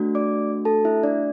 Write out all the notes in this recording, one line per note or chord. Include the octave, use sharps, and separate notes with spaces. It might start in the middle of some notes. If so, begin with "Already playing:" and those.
Already playing: A3 D4 F#4
D5 D6
A4 A5
E4 E5
D4 D5